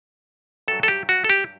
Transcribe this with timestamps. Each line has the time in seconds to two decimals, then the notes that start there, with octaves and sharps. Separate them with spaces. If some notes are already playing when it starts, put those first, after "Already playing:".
0.68 G2 F#3 A4
0.83 A4
0.88 G4
1.09 F#4
1.24 A4
1.30 G4